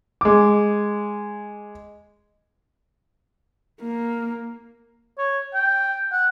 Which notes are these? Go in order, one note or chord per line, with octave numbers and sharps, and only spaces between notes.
G#3 D6
A#3
C#5
G5
F#5